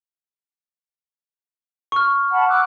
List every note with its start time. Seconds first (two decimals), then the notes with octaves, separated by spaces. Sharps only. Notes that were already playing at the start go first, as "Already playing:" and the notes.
1.92 C#6 F6
2.32 F#5 A5 B5
2.49 D6 E6 F#6